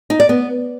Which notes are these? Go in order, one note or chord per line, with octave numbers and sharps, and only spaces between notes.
D#4
D5
B3